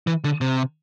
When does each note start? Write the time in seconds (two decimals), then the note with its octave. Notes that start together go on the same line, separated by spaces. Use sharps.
0.07 E3
0.24 D3
0.41 C3